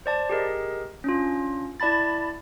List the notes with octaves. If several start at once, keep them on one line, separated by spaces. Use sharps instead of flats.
C5 D5 A5
G4 G#4 A#4 D#5
C#4 D4 F4
E4 D5 A5 B5 A6